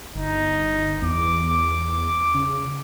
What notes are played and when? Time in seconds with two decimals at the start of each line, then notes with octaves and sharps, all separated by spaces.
0.15 G1 D#4
1.02 E2 D6
2.34 C#3